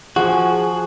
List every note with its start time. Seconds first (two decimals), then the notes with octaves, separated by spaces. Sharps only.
0.16 F3 F#4 G#4